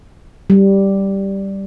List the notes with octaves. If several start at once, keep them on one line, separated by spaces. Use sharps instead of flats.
G3